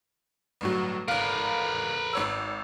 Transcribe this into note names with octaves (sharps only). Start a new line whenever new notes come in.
G1 A2 F#3
G#1 A#4 B4 F5
G#1 C#5 E6